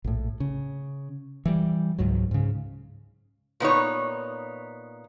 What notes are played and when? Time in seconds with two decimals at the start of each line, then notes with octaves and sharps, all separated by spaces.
0.04 A#1 A2
0.40 C#3
1.46 E3 G3
1.99 C#2 G#2 F#3
2.31 G#2 C#3
3.60 A#2 B3 D#4 C#5